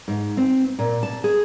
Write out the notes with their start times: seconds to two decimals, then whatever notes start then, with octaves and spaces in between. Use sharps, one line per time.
0.08 G#2
0.37 C4
0.79 A#2
1.03 A5
1.24 G#4